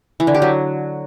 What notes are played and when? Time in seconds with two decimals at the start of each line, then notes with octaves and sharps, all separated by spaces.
0.20 E3
0.27 D3
0.34 G4
0.42 F#3